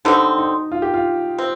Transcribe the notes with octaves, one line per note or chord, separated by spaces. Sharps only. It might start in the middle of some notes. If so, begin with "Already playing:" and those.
D3 G3 C4 D#4
D#4
F4
G4
F4
C4